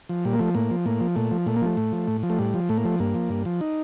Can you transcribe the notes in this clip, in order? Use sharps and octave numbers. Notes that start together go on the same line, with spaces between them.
F3
A#2 G3
A#3
F3 A3
A2 A#3
F3
A2 A#3
F3
A#2 A3
F3
A#2 A3
A#3
F3 A3
A2
F3
A2
F3
A3
A2 G3
F3
A2 A3
A#3
F3 A3
G2 A#3
F3
G2
F3
D#4